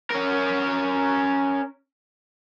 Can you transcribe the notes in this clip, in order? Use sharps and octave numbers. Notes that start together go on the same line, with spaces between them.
C#4 A#4